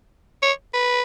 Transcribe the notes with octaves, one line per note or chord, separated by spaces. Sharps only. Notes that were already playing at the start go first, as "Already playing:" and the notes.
C#5
B4